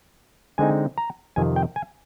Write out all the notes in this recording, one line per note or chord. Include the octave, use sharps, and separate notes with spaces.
D3 G#3 C4 D#4 G#5
A#5
F2 C3 D#3 G#5
G5
G#5